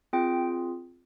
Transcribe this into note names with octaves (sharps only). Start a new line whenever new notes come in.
C4 F4 G#4 G5